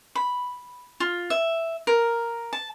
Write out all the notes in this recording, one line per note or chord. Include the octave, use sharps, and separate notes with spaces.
B5
F4
E5
A#4
A5